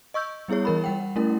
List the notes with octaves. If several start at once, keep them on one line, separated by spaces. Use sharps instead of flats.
D#5 C#6 E6 G6
G3 B3 E4 G#4 C#5
E3 A#4 B5
G3 F#5 G5
A3 C#4 E4 A#4